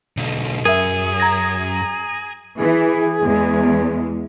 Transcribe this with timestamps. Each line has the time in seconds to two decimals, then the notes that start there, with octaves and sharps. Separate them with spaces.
0.17 B1 D3
0.65 F#2 G#4 A#4 E5
1.20 A#5 G#6 A#6
2.58 E3 G#4
3.22 E2 G#3